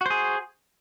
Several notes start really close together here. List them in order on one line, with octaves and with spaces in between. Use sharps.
F#4 C5 G#4